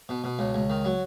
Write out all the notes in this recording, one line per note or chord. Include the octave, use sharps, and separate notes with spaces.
B2
B2
C#2
C#2
D#3
F#3